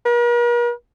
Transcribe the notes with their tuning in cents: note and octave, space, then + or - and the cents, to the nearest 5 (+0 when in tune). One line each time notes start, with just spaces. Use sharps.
A#4 +45